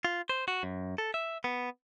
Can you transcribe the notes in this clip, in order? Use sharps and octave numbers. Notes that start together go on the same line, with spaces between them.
F4
C5
F#4
F#2
A4
E5
B3